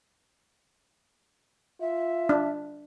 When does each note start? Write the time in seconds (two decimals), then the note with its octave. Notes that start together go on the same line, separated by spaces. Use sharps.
1.80 F4 E5
2.29 D4